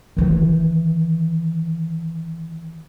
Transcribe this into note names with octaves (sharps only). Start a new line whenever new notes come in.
D#3 E3